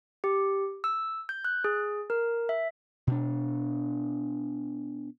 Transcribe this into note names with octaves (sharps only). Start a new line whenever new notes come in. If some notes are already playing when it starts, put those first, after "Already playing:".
G4
E6
G6
F#6
G#4
A#4
E5
B2 D4